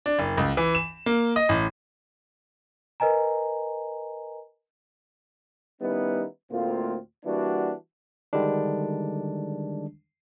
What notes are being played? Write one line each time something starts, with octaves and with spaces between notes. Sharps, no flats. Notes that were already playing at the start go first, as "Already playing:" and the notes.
D4
F#1
C#2
E3
E7
A#3
D#5
A1
A#4 B4 D#5 G#5 A#5
D#3 G3 B3 C#4 D#4 E4
D2 A2 A#3 C4 F4
E3 G3 A#3 D4 F#4
D3 D#3 G3 G#3 D4